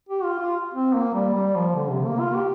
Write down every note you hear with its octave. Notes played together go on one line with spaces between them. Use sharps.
G4
F4
F4
C4
A#3
G3
G3
F3
D3
C3
A#3
F4
G4